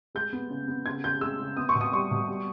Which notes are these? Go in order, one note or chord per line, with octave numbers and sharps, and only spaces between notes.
G#3 G6
B3
C#3
B3
C#3 G#6
C#3 G6
G#3 E6
C#3
B3 D#6
C#6
B2
D#6
G3 C#6
B2
G3